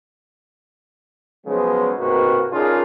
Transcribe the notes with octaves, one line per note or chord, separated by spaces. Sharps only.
C#3 F3 F#3 G#3 B3
A1 G#2 C3 A#3 F#4 B4
C#3 D4 D#4 F4 G#4 A#4